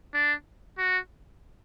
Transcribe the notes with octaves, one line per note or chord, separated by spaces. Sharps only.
D4
F#4